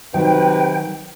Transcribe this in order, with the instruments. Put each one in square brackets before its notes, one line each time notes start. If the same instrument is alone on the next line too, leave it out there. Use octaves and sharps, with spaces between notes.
[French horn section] C3 B4 C5 [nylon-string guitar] D#3 F#3 [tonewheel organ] G5